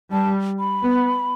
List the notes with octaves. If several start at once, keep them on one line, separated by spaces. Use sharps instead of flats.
G3 A5
B5
B3